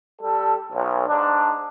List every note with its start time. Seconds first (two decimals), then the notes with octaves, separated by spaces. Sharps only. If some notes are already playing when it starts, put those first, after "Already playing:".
0.21 G3 A4
0.72 B1
1.07 G#2 D4